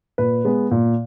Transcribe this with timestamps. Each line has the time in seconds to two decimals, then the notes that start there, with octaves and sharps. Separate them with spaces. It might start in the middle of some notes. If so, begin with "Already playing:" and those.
0.18 A#2 B4
0.45 G#3 B3
0.71 A#2